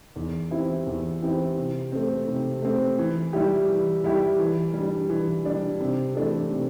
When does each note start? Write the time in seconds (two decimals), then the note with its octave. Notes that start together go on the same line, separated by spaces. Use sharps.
0.16 E2
0.51 E3 C4 E4 G4
0.87 E2
1.22 E3 C4 E4 G4
1.57 C3
1.92 A3 C4
2.28 C3
2.62 A3 C4
2.99 E3
3.33 G3 E4 G4
3.69 E3
4.04 G3 E4 G4
4.39 E3
4.74 G3
4.79 D4
5.10 E3
5.45 G3 D4
5.80 C3
6.15 E3 A3 D4 A4
6.51 C3